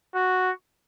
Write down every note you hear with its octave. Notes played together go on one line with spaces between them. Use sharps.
F#4